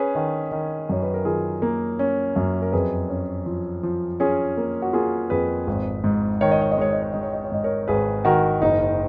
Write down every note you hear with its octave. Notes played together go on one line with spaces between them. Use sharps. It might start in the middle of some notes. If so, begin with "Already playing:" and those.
Already playing: C#4 G#4 B4
D#3
D#3
F#2 C#5
B4
A#4
D#3 F4 G#4
A#3
C#4
F#2
A#4
F2 G#4 B4
C#4
F3
F3
C#4 F4 G#4
A#3
F#4
A#3 F4 G#4
F2 G#4 B4
G#1
G#2
D#3 C#5
D#5
C#5
D#5
G#3 C#5
D#5
C#5
G#3 D#5
C#5
D#5
C#5
G#2 D#5
A#4 C#5
G#1 G#4 B4
D#3 F#4 A#4
F#1 D#4